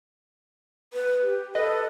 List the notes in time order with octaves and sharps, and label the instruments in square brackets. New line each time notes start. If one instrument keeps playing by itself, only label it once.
[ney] B4
G4
[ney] A4 [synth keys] B4 D#5